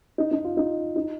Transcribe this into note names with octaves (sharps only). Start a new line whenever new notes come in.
D#4
D#4
F4
D#4
D#4